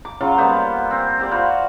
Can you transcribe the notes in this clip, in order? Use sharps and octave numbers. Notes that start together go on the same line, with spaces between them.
D6
C#3 F#3 F4
G3 A#3 B3 C5
C4
C4 G4 D5
F4 F#4 C5 B5